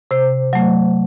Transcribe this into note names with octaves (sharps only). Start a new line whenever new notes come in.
C3 C5
F#3 A3